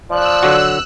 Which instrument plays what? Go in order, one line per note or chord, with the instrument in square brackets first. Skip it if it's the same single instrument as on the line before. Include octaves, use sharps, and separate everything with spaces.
[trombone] F3 [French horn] D5 [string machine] E6 F#6
[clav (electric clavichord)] D3 F#3 F#4